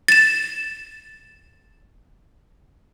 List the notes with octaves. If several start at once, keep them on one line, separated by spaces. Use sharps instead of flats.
A6 E7